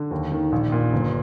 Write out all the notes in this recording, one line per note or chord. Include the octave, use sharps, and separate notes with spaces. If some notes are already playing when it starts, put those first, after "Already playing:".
Already playing: D3
D#2
D#3
A#1
A#2
G1